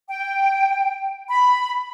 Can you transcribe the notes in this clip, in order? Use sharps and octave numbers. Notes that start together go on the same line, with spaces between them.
G5
B5